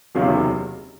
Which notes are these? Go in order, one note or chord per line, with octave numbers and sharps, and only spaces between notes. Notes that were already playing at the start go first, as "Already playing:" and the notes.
F#1 E2 C3 D#3 F#3 F5